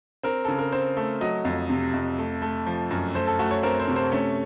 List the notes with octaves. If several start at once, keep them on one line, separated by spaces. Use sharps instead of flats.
C4 A#4
C#3 A4
A#4
C4 C5
A3
F#3 D#5
F2
C3
F2
A3
A3
F3
F#2
A3 C5
A4
A3 F#4
C#5
C4 A#4
C5
C3
C5
A3 C#4